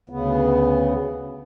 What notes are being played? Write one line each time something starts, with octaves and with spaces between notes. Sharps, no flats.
D2 C#3 B3